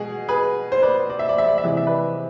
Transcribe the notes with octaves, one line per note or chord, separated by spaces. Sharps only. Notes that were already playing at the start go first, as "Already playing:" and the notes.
Already playing: B2 G#3 G#4
G#4 B4
C5
B4 D5
D5
E5
D5
E5
D5
E5
C3 E3 G#3 D5
E5
B4 D5